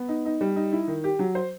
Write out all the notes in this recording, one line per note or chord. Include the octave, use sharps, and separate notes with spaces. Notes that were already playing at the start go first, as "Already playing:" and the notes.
Already playing: B3
D#4
D#4
G3
D#4
E4
D#3
G4
F#3
C5